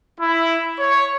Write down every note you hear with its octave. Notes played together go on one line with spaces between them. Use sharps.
E4
C#5